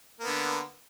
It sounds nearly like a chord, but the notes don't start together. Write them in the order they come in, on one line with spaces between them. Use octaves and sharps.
A#3 B3 D3